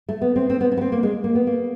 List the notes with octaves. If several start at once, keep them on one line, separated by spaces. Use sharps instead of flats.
A3
B3
C4
C4
B3
C#4
B3
C4
A#3
G#3
A#3
B3
A#3